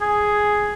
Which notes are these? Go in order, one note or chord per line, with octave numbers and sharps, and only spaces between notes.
G#4